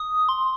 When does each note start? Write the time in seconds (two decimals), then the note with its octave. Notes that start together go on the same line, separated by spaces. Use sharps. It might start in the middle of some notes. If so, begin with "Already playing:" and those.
Already playing: D#6
0.29 C6